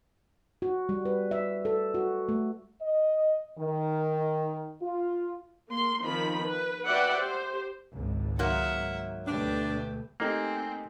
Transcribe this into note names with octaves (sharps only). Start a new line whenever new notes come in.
F#4
G3
B4
E5
A4
F#4
A3
D#5
D#3
F4
A#3 C6
D#3 F3 C4 B5
B4
F#4 B4 D5 E5 F#5 G5
G4 C5
G#1 C#2
G#2 F#3 A#3 E5 F#5
D2 B2 A3 D4 G4 B4
A3 A#3 C4 D#4 G4 G#5